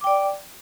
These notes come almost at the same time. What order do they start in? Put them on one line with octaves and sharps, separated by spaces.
D6 G5 D5